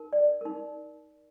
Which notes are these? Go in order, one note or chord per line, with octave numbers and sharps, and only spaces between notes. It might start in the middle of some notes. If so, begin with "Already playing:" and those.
Already playing: D#4 A#4
D5
D#4 A#4